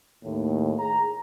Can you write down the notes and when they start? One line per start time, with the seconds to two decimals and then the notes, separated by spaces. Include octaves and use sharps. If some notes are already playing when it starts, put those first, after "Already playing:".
0.24 D#2 A2
0.79 G#4 A#5